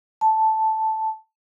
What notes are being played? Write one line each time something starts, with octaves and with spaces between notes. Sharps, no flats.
A5